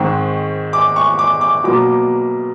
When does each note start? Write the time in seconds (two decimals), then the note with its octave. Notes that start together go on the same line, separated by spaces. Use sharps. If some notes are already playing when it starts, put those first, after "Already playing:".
Already playing: G#2 D#3 G#3 C4 C#6
0.73 D6
0.96 C#6
1.19 D6
1.41 D6
1.64 B2 F#3 A#3 D6